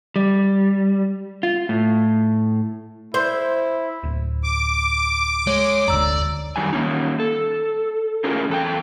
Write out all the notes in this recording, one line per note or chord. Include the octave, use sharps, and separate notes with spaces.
G3
F4
A2
E4 C5
D1
D6
G#3 C#5
F1 D2 D5 A#5 E6
F#2 D#3 G3 G#5
D#3 A#3 C#4 D#4
A4
A3 C#4 F4 G#4 A#4
E2 A4 G5